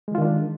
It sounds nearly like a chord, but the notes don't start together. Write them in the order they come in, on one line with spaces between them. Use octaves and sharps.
G#3 E3 F4 D#3 D4